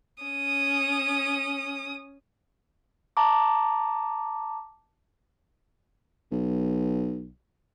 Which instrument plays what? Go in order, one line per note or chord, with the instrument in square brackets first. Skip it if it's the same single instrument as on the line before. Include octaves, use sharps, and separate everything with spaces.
[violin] C#4 D#6
[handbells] A5 A#5 D6
[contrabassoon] B1